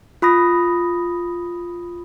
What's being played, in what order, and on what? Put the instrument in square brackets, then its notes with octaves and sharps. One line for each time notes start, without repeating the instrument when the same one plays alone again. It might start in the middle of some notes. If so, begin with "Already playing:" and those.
[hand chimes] F4 B5 D#6 A#6